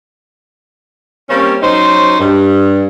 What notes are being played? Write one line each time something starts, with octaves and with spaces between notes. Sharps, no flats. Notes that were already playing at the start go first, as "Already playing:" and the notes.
G3 A#3 C4 C#4
F#3 C#4 D#4 C5
G2